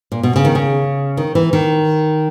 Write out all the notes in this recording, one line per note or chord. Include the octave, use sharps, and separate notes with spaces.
A#2
B2
C#3
D#3
C#3
D#3
E3
D#3